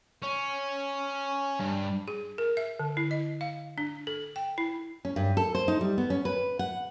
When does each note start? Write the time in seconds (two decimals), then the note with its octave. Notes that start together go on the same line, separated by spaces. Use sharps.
0.22 C#4
1.60 G2
2.08 G#4
2.38 A#4
2.57 E5
2.79 D3
2.97 E4
3.11 D#5
3.41 F5
3.78 D4
4.07 A4
4.36 G5
4.58 E4
5.05 C#4
5.16 G2
5.37 A4
5.55 C5
5.68 D#4
5.81 G3
5.98 B3
6.10 C#4
6.25 B4
6.59 F#5